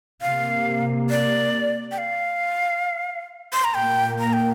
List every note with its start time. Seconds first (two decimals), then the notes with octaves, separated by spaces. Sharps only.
0.22 C3 A#3 F5
1.10 D5
1.91 G5
1.98 F5
3.53 C6
3.64 A#5
3.74 A#2 A#3 G5
4.19 A#5
4.33 G5